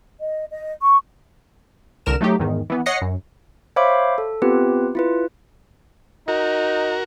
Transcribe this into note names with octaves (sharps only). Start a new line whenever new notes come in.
D#5
D#5
C#6
C2 D3 A#4 F6 E7
F#3 A3 D#4 G4
E2 G#2 D#3
E3 B3
C#5 D#5 F#5 A#6 C7 C#7
F#2
C5 C#5 E5 F5 B5 D6
A4
B3 C4 F4 G4 B4
E4 F4 B4
D#4 F#4 A#4